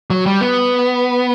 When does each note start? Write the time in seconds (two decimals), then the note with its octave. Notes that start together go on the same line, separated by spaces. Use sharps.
0.10 F#3
0.26 G3
0.41 B3